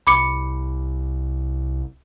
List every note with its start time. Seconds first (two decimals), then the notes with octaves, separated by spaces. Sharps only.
0.07 C2 B5 D6 C#7